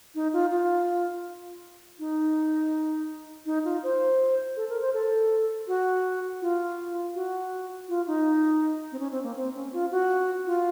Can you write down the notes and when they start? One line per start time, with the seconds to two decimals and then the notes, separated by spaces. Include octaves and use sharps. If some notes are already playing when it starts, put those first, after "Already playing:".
0.15 D#4
0.33 F4
0.51 F4
1.99 D#4
3.46 D#4
3.65 F4
3.83 C5
4.57 A4
4.69 A#4
4.82 C5
4.94 A4
5.68 F#4
6.42 F4
7.15 F#4
7.89 F4
8.07 D#4
8.92 C4
8.99 C#4
9.11 C4
9.23 A#3
9.36 C4
9.55 C#4
9.73 F4
9.92 F#4
10.46 F4